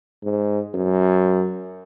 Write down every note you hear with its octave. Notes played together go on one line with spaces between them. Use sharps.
G#2
F#2